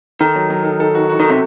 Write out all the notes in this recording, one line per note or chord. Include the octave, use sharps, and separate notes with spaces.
D#3 A4
F#3
F#3
A4
A4
F#4
F#4
D#3 A4
C3